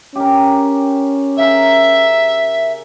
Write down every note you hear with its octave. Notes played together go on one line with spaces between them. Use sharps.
C#4 G4 A#4
C#3 A#4 E5